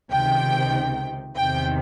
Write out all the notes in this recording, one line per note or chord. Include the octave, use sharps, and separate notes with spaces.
C#2 C3 D#3 G5
E2 C3 D#3 G5